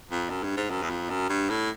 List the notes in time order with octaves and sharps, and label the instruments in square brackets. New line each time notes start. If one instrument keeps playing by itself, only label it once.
[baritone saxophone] F2
F#2
G2
G#2
F#2
E2
F2
F#2
G2
A2